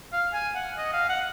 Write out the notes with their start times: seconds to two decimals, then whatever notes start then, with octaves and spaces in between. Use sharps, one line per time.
0.13 F5
0.33 G#5
0.55 F#5
0.78 D#5
0.93 F5
1.09 F#5